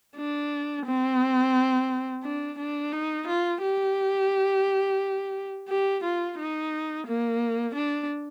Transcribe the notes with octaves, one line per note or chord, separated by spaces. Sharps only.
D4
C4
D4
D4
D#4
F4
G4
G4
F4
D#4
A#3
D4